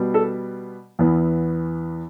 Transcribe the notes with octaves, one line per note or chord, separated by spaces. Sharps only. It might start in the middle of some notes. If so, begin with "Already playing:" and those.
Already playing: B2 G3 B3
A4
E2 E3 B3